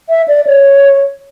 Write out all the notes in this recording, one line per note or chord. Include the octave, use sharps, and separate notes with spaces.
E5
D5
C#5